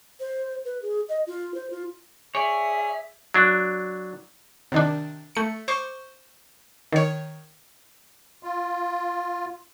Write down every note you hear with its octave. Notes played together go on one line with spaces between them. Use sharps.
C5
B4
G#4
D#5
F4
C5
F4
G#4 C#5 D5 E5
F#3 D4
C3 D#3 D4
A3 C#7
C5 C#6 D6
D#3 C#5
F4